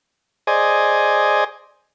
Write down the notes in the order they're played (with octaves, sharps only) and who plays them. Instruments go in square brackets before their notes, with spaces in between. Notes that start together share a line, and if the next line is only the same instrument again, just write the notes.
[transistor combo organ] G#4 C5 D5 D#5 G#5